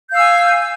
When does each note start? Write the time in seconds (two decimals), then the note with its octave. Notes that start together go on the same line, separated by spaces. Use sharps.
0.09 G6
0.12 F5
0.15 E6
0.19 G#5